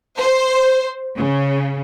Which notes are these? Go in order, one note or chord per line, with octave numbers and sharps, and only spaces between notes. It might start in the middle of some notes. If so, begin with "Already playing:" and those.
C5
C#3